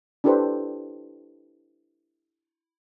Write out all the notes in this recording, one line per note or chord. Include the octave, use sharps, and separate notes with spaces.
D4 E4 G4 A4 B4 C5